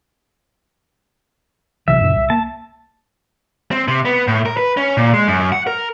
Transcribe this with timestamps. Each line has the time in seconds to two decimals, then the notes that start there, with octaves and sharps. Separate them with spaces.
1.88 B1 C3 E3 E5
2.00 F#2 A#2 C#3
2.16 C2
2.30 A#3 A5
3.71 C4
3.88 C3
4.05 B3
4.28 A2
4.46 A#4
4.57 B4
4.77 C#4
4.97 A#2
5.14 G#3
5.28 F#2
5.52 F#5
5.67 A#4